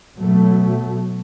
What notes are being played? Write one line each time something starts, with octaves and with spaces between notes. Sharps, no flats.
B2 F#3 A3